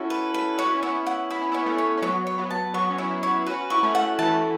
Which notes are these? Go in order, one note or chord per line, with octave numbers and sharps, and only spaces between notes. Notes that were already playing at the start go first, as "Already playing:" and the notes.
Already playing: C#4 E4 F#4 A4
B4
B4
F#4 C#5
E4
C#4
B3 E4 C#5
F#5
E4 B5
C#4
B3 E4
C#5
A3 C#4
C#5
C#4
F#3 B3 C#5
C#5
F#3 B3
A5
F#3 B3 C#6
C#4
B3 E4 C#5
B3 E4 C#5
C#4 F#4 B4
E4 C#6
A3 C#4
F#5
E3 A3 A5